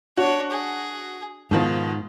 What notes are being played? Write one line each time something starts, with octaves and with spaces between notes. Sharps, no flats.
D4 F#4 C#5
G#4
G#2 B2 D#3 F3 F4